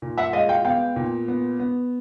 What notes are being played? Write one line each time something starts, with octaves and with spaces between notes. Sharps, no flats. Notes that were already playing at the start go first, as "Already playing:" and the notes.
A#2
E5 F#5
G#3 D#5 F5
F5 G5
B3 F5 G5
A#2
B3
B3